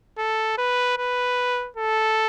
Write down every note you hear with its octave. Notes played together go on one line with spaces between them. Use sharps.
A4
B4
B4
A4